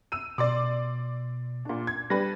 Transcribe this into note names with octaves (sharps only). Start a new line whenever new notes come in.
E6 D#7
B2 D5 C6 D6
A#2 D4
G#6
G3 D4 B4 A#6